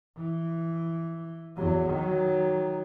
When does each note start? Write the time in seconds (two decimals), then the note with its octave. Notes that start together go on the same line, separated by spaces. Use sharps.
0.17 E3
1.56 E2 F#3
1.90 D#3 F#3